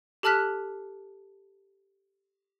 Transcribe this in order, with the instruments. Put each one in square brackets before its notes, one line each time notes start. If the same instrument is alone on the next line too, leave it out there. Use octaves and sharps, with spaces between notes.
[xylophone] G4 A4 A5 F6 F#6 B6